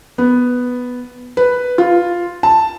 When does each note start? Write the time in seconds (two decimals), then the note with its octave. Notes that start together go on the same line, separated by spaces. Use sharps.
0.18 B3
1.37 B4
1.78 F4
2.43 A5